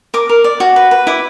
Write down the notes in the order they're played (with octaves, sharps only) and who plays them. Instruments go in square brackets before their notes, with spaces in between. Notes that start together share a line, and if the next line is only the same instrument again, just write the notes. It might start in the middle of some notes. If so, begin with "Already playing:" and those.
[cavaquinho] A#4 D6
A#4
D5
F#4
B4
B4
E4 D6